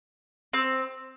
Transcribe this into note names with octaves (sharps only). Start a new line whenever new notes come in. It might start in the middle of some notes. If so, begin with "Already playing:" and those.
C4